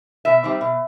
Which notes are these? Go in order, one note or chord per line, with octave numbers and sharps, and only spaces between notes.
B2 E5
G3 C4 D#4
B2